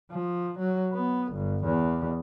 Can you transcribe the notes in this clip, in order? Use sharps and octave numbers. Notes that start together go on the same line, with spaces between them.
F3
F#3
B3
G1
E2